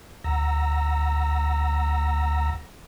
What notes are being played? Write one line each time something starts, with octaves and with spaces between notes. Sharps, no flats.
D2 F#5 A#5 E6 A#6